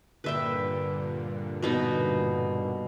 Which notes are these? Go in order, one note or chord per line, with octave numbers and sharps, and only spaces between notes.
G2 A#2 D3 B4 E5 G5
B2 B3 D#4